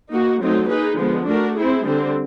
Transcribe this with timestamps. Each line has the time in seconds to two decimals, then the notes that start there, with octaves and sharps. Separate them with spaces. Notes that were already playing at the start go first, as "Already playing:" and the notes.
0.11 A#3 D#4 F#4
0.41 F#3 A3 C4 D#4
0.69 A#3 D#4 G#4 B4
0.98 D3 F3 G#3 B3
1.27 A3 D4 F#4 A#4
1.56 C4 E4 G#4
1.85 D3 G3 C4